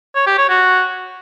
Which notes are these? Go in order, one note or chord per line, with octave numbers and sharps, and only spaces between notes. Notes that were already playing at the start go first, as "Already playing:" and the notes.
C#5
G4
C#5
F#4